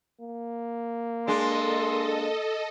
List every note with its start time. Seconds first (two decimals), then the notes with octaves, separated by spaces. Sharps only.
0.20 A#3
1.27 G#3 D4 A4 D#5 C6